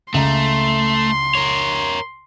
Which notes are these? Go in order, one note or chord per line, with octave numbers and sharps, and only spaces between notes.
C#2 A3 A#5 C6
A#4 C#5